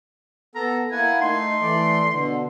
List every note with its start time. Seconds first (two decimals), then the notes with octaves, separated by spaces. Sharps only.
0.55 B3 A4 A#5
0.92 A#3 E4 F#5 G#5
1.21 A3 D#4 C6
1.61 E3 A3 D5
2.11 B2 D3